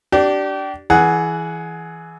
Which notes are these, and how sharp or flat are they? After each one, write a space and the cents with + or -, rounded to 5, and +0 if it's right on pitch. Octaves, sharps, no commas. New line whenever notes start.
D4 -5 G4 -30
E3 +0 G#4 +20 F#5 +0